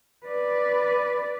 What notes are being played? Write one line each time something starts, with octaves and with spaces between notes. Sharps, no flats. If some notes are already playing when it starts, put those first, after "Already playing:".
B4 D5